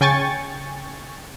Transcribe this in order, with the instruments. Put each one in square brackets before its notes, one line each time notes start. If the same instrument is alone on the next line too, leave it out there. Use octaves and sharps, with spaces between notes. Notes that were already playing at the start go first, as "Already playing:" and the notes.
[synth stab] C#3 G5 G#5 C#6 A6